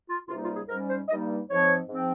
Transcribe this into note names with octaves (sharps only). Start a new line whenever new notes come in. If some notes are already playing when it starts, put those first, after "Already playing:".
F4
C#2 C3 G3 A#3 D#4 F4
F4
G#4
G#2 G3 C#4 A#4
C5
G2 G3 A#3 D#4 D#5
G#2 F3 C4 C#5
G#2 F3 C4